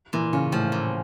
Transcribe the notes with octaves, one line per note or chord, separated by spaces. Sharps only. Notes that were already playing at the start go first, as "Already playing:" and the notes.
A#2 E3
C#3 C#4
A2 F3
A#2